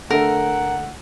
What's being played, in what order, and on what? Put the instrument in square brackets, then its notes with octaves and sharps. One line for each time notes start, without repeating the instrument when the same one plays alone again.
[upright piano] D3 A3 [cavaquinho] A#4 [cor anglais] F#5